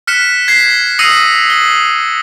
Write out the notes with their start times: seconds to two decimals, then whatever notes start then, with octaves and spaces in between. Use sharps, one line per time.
0.07 F6 F#6 B6 C#7 E7
0.48 G#6 B6 C7
0.99 D#6 E6 A#6 C7 C#7 D#7
1.50 G7